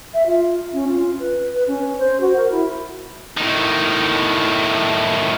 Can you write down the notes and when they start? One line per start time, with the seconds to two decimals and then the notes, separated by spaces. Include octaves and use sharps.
0.13 E5
0.26 F4
0.73 C#4
0.87 F4
1.19 B4
1.53 B4
1.67 C#4
1.98 C5
2.20 F#4
2.36 A#4
2.50 E4
3.37 A2 D#3